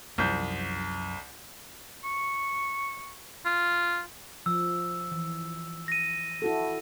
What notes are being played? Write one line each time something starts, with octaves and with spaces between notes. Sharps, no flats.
C2 F#2 F3 G6
C#6
F4
F3 E6
E3
A#6 D#7
E4 F#4 A4